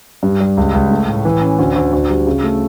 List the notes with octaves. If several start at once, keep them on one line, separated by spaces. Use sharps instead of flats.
G2
G3
C#2
C#2
A3
A2
E3
C#4
D2
D2
D2
G3
C#3
A3